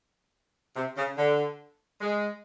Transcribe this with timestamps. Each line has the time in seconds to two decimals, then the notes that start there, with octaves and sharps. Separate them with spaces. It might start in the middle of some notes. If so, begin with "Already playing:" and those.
0.76 C3
0.96 C#3
1.18 D3
2.01 G#3